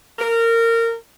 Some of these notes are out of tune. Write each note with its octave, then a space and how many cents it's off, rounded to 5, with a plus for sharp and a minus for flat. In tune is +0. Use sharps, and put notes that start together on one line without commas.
A#4 -20